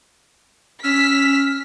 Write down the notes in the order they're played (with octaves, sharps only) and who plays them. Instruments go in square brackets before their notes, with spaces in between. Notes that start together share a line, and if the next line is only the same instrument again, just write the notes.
[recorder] C#4 [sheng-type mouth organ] E6 F6 [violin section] B6